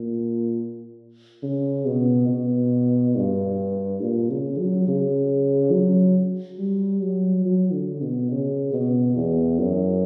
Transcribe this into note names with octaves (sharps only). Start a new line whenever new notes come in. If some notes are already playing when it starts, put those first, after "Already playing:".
Already playing: A#2
C#3
B2
B2
G2
A#2
C#3
F#3
C#3
F#3
G3
F#3
F#3
D3
B2
C#3
B2
E2
F#2